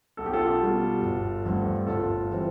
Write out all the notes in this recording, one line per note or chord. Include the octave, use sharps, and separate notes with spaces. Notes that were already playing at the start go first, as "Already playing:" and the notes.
B1 A4
G4
F4 A4
B2 G3
G1
G2 D3 A3 C4
G1 F4 A4
E3 G3 C4